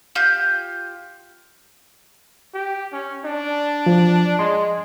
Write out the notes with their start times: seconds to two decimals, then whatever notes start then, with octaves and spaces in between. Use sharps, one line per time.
0.15 F4 G4 G6
2.54 G4
2.93 C#4
3.25 D4
3.86 F3
4.39 G#3 C6